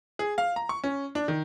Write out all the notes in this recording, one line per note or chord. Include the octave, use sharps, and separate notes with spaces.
G#4
F5
A#5
C#6
C#4
D4
D#3